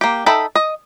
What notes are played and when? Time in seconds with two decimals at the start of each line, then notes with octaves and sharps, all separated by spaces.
0.01 A#3 G4
0.26 D#4 A4 E5 G5 B5
0.55 D#5